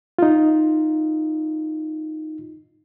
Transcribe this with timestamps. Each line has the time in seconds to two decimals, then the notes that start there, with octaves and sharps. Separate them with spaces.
0.18 D#4 F4